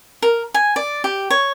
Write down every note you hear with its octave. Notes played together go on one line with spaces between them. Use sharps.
A#4
G#5
D5
G4
C#5